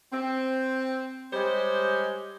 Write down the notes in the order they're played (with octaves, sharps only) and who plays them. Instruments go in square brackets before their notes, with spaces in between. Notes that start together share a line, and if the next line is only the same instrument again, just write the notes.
[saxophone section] C4
G3 G#3 G4 C5 C#5